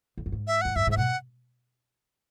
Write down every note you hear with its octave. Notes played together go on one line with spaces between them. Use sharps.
E2
F#2
G#2
E5
E2 F#5
F#2 E5
G#2 E5
B2 F#5